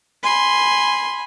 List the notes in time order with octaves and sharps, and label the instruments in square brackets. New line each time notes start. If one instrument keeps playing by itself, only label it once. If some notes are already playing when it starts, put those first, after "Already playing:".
[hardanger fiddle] G#5 B5 [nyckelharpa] C6